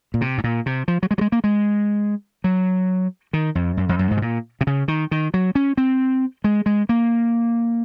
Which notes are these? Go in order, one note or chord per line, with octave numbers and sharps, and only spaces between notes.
A#2
C3
G#2
A#2
C3
F3
F#3
G#3
F#3
G#3
A#3
G#3
F#3
D#3
F2
F#2
F2
F#2
G#2
C3
A#2
C3
C#3
D#3
D#3
F#3
C#4
C4
G#3
G#3
A#3